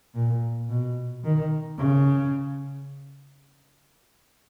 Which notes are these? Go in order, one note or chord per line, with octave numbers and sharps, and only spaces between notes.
A#2
B2
D#3
C#3